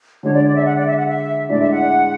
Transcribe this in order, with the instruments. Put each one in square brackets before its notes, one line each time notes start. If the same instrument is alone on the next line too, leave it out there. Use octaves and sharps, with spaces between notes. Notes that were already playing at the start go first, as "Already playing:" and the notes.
[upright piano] D3 G#3 D4 [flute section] C#5
[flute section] D5
D5
E5
F#5
D5
E5
F#5
E5
[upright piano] A2 G#3 D4 [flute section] D5
[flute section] E5
F#5